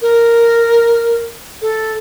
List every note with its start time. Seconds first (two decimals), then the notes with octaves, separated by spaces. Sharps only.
0.02 A#4
1.62 A4